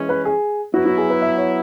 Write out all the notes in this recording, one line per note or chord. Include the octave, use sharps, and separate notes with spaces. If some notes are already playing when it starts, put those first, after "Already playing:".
Already playing: E3 G#3 C#4
B4
G#4
F#3 B3 E4 F#4
F#4
G#4
B4
E5
C#5